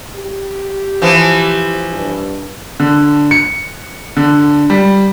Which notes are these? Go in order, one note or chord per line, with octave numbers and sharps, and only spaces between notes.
G4
E3 F3
G2
D3
C#7
D3
G3